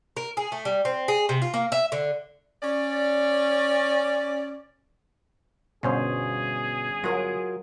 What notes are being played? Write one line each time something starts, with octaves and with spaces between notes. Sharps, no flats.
A#4
G#4
A3
G3
C4
G#4
C3
F4
A#3
E5
D3
C#4 D5
G1 B2 C#4 G#4 C5
F#3 F4 A#4 F#5